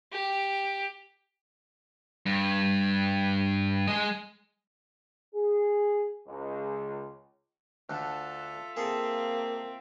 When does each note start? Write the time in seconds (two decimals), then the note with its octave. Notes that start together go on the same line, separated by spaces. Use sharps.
0.12 G4
2.26 G2
3.87 G#3 D#5
5.34 G#4
6.27 C#2
7.90 D2 D3 F4 A4 E5
8.77 A#3 C4 G#4 A4